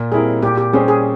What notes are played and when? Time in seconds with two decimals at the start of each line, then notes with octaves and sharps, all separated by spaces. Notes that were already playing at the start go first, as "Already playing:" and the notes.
Already playing: A#2
0.12 G3 C4 E4 G#4 A#4
0.42 A#2 G4
0.58 G4
0.72 G3 C#4 G4 G#4 C5
0.88 G#4